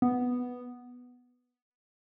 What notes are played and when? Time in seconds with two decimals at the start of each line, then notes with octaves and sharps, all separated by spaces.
0.02 B3